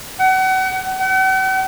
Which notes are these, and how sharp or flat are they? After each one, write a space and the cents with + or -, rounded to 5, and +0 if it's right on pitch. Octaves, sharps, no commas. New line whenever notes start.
F#5 +35
F#5 +45